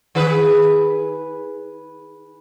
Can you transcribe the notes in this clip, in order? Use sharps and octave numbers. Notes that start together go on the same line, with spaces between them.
D#3 G#4 B4